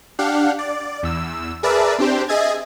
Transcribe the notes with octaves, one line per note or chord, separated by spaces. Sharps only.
D4 G4 F5 F#5
D5
E2 E6
G#4 A#4 B4 D5 E5 A5
C4 D4 G4 C5
G#4 D#5 E5 G#5 G#6 A6